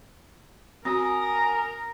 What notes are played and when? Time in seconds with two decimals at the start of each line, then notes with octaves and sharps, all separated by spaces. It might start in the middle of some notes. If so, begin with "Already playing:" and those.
0.85 C4 F#4 A#4 G#5 D#6